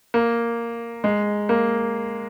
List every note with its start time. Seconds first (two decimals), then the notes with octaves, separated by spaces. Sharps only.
0.14 A#3
1.04 G#3
1.49 A#3